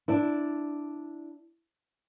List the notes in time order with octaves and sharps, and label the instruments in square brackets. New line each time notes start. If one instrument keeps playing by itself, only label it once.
[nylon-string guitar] D4 E4